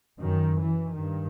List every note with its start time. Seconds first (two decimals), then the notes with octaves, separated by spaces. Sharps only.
0.20 F#2 D#3
0.60 E3
0.98 G2 D#3